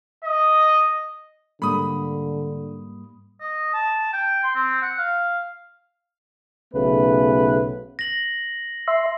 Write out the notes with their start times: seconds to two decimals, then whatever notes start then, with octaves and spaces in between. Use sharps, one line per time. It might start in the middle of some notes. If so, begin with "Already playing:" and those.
0.24 D#5
1.62 G#2 D3 G3 A#3 B5 D#6
3.41 D#5
3.74 A5
4.13 G5
4.43 C6
4.55 C4
4.82 F#5
4.98 F5
6.74 B1 C#3 A3 B3 B4
7.99 A#6 F#7
8.88 E5 C6